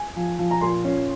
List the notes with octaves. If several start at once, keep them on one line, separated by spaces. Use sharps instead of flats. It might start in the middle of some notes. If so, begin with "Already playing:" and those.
Already playing: G#5
F3
F3
A#5
A#2 C6
C#4